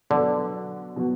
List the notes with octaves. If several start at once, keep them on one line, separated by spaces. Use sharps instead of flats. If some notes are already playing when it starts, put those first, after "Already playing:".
B2 D3 F#3 B3 F#4
B2 F#3 B3 F#4